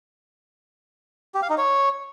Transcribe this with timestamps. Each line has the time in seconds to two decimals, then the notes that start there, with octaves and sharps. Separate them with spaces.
1.35 G4
1.42 F5
1.50 D#4
1.58 C#5